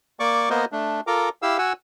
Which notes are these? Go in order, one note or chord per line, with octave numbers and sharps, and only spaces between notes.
A#3 D5 C#6 D6
A#3 B3 A#4 C5 D#5
A3 D4
F4 A4 A#4 A#5 D6
E4 G4 F5 E6
F#4 F#5 G#5 E6